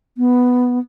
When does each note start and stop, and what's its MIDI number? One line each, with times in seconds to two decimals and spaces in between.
0.17 0.79 59